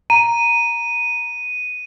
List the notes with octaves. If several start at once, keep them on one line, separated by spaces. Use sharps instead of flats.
A#5 D#7